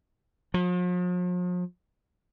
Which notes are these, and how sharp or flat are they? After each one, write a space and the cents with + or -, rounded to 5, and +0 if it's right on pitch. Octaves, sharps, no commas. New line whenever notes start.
F3 +45